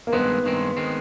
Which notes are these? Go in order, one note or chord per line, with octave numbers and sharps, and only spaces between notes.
A#3
G2 D#3 G#3 B3 C4
G2 D#3 G#3 C4
D#3 G#3 C4